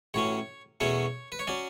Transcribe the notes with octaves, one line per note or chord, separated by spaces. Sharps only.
A1 A2 F#3 C#4 C#5
E2 B2 F#3 A3 C#4 C#5
B4
C#5
F#3 C#4 D5